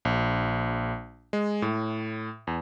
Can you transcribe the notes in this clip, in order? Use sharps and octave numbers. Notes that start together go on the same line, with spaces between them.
A#1
G#3
A2
E2